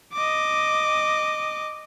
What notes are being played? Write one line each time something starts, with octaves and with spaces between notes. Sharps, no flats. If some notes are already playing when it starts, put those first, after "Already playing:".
D#5 D6